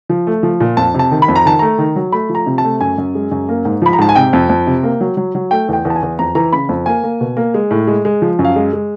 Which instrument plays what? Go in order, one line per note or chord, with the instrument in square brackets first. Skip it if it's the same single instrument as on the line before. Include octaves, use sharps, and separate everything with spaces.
[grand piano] F3
A3
F3
A#2
F2 A5
C3 A5
D#3
B5
F2
A#5
D#3 A5
A3 A#5
D#3
F#3
A3 B5
F3
A#5
C3
A5
A3
F#2 G#5
F#2
G#3
F#2
A#3
G#2
F3 B5
A#5
G#2 A5
G#5
C3 G5
F2
F2
C3
A#3
F#3
F#3
F#3
A3 G5
E2 G5
E2
A5
G#5
E2
F2 A#5
E3 A#5
C#3 B5
F2
A#3 G#5
A#3
B2
A#3
G#3
A2
G#3
G#3
F3
F#2
F5
G#3
G#3